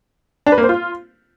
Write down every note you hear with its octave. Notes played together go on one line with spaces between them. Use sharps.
D4
B4
A#3
C5
F4